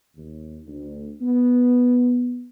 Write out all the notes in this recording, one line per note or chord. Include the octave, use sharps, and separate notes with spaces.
D#2
D2
B3